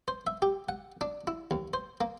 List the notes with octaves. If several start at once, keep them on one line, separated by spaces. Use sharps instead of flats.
C5
E5
G4
F#5
D4
E4
D#2
C5
A#3